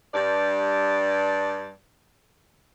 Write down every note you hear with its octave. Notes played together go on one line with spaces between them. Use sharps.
G2 D5